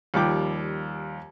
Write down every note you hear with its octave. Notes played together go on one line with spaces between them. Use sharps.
D#2 F3 G3 G5 D6